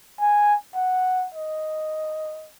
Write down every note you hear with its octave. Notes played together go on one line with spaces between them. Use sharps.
G#5
F#5
D#5